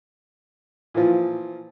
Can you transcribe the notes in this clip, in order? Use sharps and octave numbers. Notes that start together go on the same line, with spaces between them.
A#2 E3 F3